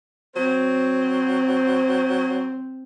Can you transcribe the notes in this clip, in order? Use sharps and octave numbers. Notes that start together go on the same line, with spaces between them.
F#3 C4 C5